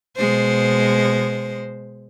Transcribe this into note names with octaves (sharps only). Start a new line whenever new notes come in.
B2 G#3 C5